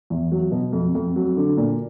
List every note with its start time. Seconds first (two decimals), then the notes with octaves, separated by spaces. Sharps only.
0.10 E2
0.31 F#3
0.51 B2
0.73 F2
0.95 F2
1.16 F#3
1.37 D3
1.57 A#2